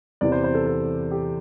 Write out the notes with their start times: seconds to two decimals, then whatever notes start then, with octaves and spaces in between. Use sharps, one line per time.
0.21 E2 C3 E3 D5
0.32 C5
0.44 C5
0.55 A4
0.66 A4
1.11 G4